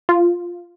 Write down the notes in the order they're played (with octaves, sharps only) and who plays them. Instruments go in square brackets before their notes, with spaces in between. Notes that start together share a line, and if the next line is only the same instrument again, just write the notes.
[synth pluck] F4